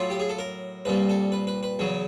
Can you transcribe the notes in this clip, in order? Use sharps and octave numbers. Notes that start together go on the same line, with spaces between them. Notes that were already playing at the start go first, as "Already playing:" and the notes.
Already playing: A2 F#3 F4
G4
G#4
A4
A#4
C2 A#2 G3 B4
A4
B4
B4
B4
E2 C#3 F#3